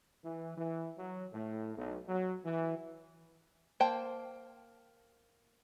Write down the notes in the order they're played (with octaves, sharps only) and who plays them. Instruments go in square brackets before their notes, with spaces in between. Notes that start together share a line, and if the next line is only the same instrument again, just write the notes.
[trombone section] E3
E3
F#3
A2
B1
F#3
E3
[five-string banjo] A#3 C5 G5 A5